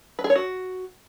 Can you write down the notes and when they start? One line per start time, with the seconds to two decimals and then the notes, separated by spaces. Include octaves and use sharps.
0.19 B4
0.24 G#4
0.30 C#5
0.36 F#4